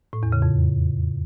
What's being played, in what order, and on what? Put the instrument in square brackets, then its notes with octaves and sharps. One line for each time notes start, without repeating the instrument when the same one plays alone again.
[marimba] A2
E2
C#3
F2